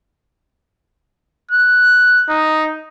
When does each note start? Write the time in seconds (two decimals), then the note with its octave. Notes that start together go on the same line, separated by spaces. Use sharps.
1.51 F#6
2.30 D#4